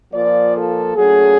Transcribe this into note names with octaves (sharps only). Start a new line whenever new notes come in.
A#2 F3 A#3 D5
A4
A#2 F#3 A3 C#4 G#4